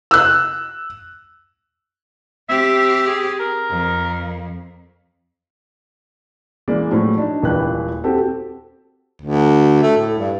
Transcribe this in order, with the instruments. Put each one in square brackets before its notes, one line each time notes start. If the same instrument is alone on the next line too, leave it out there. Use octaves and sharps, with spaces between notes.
[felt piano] E6 F#6
[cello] C4 G4 [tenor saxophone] E5
[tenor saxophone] G#4
A#4
[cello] F2
[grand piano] E3 G#3 A#3 D5
A2 F3 F#3
D4 D#4
D#1 C#2 E3 B4 G5 F#6
C4 F#4 G4 A4
[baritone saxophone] D2
A3
A2
G2